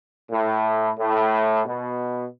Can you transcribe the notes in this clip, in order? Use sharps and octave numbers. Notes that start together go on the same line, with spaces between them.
A2
A2
B2